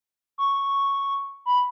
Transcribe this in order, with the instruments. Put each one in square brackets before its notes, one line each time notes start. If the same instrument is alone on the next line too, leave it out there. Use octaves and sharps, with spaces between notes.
[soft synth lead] C#6
B5